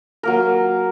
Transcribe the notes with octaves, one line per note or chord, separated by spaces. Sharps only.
F#3 A#3 A#4